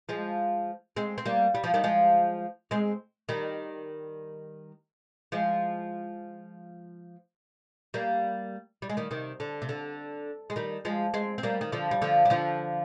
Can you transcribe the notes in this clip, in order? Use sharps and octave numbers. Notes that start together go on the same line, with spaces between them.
F3 G#3
G#3 C4
C4
G3 A#3
G3
F3
D#3 G3
F3 G#3
G#3 C4
D#3 G3
F3 G#3
G3 A#3
G3
G#3
D#3 G3
C3 D#3
D3
C3
D3
G#3
D#3 G3
F3 G#3
G#3 C4
C4
G3 A#3
D#3
D3 F3
G3
D3 F3
G3
D3 F3